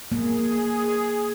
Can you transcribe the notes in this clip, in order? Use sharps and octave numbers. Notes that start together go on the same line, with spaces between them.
A#3 G#4